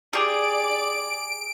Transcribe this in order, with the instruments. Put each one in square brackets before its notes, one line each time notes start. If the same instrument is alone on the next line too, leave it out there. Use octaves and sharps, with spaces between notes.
[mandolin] G4 G#4 [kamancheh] D5 [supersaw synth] D7